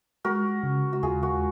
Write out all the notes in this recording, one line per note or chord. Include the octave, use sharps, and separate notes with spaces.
G#3 F#4 A#4
C#3
F#4
D#2 F4 G#4
F#4 A#4